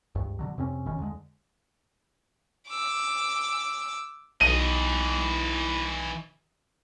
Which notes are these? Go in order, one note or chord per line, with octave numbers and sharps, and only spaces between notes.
C#2 G2
B2 D3 F#3
F2 C3 C4 C#4
G#1 B2 D#3 C#4
E2 D3 G#3
D6 E6
B1 E3 D#5 D#7